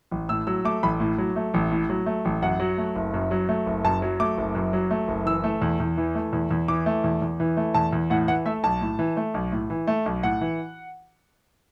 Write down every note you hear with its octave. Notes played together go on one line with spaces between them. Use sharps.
A1
A2 E6
F#3 E6
A3 D6
A1 B5
A2
F#3
A3
A1
A2
F#3
A3
A1
F#2 F#5
F#3
A3
F#1
F#2
F#3
A3
F#1
F#2 A5
F#3
A3 D6
F#1
F#2
F#3
A3
F#1
E3 E6
A3
E2
E2
E3
A3
E2
E2
E3 D6
A3
E2
E2
E3
A3
E2 A5
E2
A2 F#5
E3 F#5
A3 E5
B1 A5
A2
E3
A3
B1
A2
E3
A3
B1
A2 F#5
E3